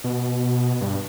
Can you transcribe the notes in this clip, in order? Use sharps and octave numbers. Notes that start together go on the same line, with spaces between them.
B2
G2